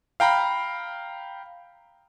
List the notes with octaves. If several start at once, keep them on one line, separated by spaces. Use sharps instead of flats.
F5 G5 A#5 B5